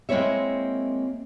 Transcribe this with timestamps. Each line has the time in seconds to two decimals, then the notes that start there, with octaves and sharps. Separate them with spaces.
0.09 G#3 A#3 C4 E4 C#5 E5